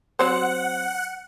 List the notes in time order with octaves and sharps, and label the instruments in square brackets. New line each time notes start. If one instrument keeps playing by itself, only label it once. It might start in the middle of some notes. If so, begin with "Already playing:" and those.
[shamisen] F#3 C4 C5 [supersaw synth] F#5